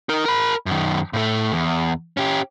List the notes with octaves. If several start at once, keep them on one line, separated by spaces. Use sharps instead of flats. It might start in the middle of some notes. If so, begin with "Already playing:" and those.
D#4 A#4
A#4 B5
F#2 D#3
A2 A3
E2
C#4 G4